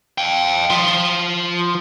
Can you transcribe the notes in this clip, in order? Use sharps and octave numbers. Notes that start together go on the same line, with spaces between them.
F5 G5
F3 F4